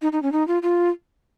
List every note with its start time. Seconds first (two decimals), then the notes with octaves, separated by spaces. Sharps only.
0.02 D#4
0.12 D#4
0.23 C#4
0.32 D#4
0.48 F4
0.63 F4